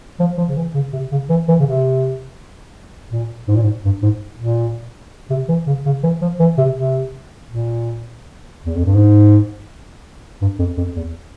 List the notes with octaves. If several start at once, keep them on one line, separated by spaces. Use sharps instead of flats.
F3
F3
C#3
E3
C#3
C3
C#3
E3
E3
C#3
C3
A#2
G#2
A#2
G#2
G2
G#2
A#2
C3
E3
C#3
C#3
E3
F3
E3
C3
C3
A#2
E2
F2
G2
G#2
G2
F2
F2
E2